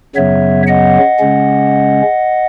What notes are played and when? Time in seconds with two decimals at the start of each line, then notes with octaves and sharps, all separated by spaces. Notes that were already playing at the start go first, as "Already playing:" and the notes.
0.16 F#2 C#3 F#3 B3 C#5 E5
0.67 D#5 F#5
1.19 C#3 G#3 C#4